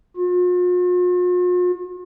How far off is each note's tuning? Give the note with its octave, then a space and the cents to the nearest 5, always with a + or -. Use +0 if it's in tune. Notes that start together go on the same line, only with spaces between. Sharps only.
F4 +45